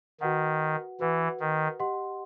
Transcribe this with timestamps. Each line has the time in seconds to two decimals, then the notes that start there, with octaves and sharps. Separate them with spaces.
0.21 D#3 F#4 B4 F#5
1.00 E3 F#4 B4 F#5
1.40 D#3
1.79 G4 D#5 F#5 C6